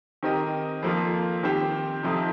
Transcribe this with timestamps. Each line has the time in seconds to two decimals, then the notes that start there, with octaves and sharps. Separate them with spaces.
0.23 D#3 C4 G4 A#4 D#5
0.83 F2 F3 A#3 F4
1.43 D#3 C4 G4 C5
2.03 F2 C3 F3 D#4